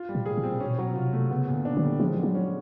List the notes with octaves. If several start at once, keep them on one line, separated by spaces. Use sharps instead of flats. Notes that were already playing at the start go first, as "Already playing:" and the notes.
Already playing: F4
G3
A#2
G#4
A#2
C4
B2 C#4
F#3
C3 F4
A3
C#3 B3
A#2
D3
D4
D3
G3
F3 G#3
D3
F#3
C#4